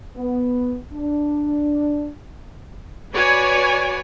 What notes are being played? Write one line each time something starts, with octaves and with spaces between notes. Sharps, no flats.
B3
D4
F#4 B4 C#5 D5 G#5